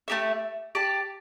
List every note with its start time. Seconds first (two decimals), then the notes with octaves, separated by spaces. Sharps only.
0.08 A3 E4 G4 E5
0.75 G4 D5 A5